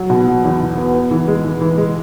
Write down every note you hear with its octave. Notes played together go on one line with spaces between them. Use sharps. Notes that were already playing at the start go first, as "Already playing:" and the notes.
Already playing: F#3
B2
F#3
E2
B2
B3
B3
E3
G#3
E3
E3
G#3